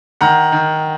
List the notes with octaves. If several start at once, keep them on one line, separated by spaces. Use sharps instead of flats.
D#3 F#5 A#5
D#3